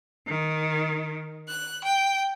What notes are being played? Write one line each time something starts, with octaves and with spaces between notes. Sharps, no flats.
D#3
F#6
G5